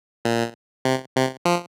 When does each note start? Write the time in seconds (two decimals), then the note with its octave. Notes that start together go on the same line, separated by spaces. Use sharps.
0.25 A#2
0.85 C3
1.15 C3
1.45 F3